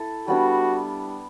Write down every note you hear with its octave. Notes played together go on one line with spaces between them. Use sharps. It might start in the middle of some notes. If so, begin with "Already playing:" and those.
Already playing: E4 A4
G3 B3 D4 F#4